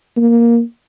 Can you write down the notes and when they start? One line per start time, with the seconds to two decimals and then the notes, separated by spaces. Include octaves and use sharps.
0.17 A#3